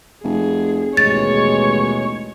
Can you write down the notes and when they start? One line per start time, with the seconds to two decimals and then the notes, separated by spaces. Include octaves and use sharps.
0.24 F1 G#4
0.97 A1 D#2 B2 G#3 C#5 C#6 A6